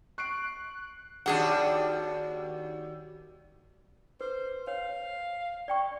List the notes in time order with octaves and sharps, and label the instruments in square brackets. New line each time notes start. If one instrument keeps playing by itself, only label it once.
[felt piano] C#6 C7 D7 [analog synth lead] F#6
[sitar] D#2 G3 F#4 [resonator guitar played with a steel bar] D4 G#4 F#5
[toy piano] B4 [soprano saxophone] C5
[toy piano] C#5 [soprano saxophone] F5
[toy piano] D5 G5 C#6